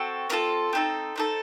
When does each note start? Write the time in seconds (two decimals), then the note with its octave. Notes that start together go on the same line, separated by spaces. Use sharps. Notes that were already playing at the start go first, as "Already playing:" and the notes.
Already playing: C4 F#4 A4
0.30 C4 F4 A4 A#4
0.73 C4 D#4 A4
1.16 C4 D#4 A4